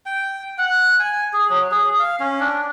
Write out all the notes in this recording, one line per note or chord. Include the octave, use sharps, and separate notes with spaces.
G5
F#5
G#5
G#4
F#3
G#4
F5
C#4
D4